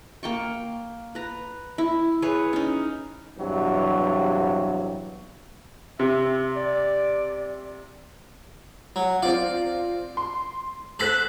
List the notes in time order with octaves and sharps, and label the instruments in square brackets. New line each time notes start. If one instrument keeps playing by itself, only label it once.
[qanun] A#3 G5 C#6
B4 A#5
E4
G#4 B4 C#5
C#4 D#4
[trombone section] E2 G2 C3 F#3
[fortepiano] C3 [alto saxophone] E5
[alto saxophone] D5
[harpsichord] F#3
[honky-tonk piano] C4 F4 [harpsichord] D5
[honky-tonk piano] C6
[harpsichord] A4 C5 [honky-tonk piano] F#6 B6 F#7